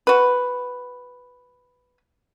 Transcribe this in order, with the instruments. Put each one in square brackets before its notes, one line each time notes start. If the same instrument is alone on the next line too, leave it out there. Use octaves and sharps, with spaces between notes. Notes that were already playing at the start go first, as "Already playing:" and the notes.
[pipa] F#4 B4